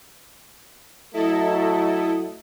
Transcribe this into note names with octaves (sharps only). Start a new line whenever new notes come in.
F#3 A3 E4 A4 D#5